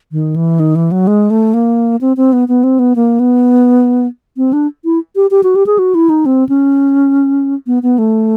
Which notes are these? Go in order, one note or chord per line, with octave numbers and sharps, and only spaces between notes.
D#3
E3
D#3
E3
F#3
G#3
A3
A#3
C4
C4
B3
B3
C4
B3
A#3
B3
C4
D4
E4
G4
G4
F#4
G4
G#4
F#4
E4
D#4
C4
C#4
B3
B3
A3